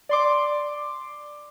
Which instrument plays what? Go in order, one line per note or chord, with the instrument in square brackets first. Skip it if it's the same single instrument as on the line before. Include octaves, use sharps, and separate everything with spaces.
[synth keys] D5 C6 D6